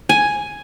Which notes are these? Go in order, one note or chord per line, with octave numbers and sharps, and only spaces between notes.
G#5